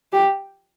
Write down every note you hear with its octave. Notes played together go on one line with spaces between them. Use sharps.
G4